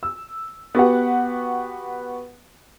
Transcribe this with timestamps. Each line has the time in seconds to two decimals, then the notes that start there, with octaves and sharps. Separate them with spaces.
0.03 E6
0.75 B3 F#4 G4 F#5